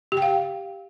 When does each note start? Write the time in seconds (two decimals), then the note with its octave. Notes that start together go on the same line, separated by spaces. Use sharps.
0.12 G4
0.17 G5
0.22 F5